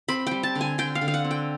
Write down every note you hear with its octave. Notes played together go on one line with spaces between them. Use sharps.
C4 B5
G3 G5
A5
D3
G#5
D3 G5
F5
D3
F5
F#5
C4
G5